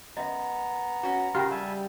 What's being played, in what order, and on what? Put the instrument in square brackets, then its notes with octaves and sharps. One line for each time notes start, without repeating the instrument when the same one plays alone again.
[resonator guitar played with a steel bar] F#2 [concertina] B3 A#5 [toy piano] D#5 E5
[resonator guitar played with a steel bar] C#4 F#4
[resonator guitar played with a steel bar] C#3 [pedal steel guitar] F4 A#4 [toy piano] G4 F#5 G5
[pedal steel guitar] G3 [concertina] E5 G#5 A5